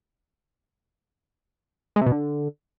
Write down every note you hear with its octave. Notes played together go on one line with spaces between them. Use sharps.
G#3
C3
B2
D3